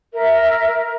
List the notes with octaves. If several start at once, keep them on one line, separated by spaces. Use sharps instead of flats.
A#4 E5